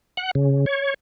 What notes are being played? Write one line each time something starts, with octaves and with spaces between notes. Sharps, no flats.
F#5
C#3
C#5